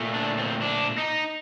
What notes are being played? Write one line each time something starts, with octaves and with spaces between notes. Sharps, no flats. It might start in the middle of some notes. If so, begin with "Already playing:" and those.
Already playing: A#2 A3
D4
C4
D4
D#4